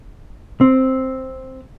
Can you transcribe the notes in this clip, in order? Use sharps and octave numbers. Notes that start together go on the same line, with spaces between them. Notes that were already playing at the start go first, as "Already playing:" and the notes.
C4